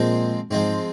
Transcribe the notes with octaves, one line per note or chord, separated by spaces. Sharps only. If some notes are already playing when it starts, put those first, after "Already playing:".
Already playing: A#2 F3 G#3 C4
G#2 F3 G#3 C4